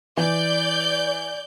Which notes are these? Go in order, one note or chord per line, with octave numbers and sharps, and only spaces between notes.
E3 D5 G6